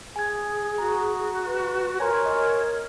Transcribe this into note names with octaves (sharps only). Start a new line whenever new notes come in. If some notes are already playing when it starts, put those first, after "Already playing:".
G#4 G#5 G#6
F#4 A#5
B4
A#4 C#5 G#5 A#5 C6
D#5